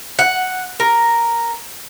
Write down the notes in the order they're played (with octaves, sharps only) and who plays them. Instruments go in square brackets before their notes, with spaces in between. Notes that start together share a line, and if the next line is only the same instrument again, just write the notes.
[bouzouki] F#5
A#4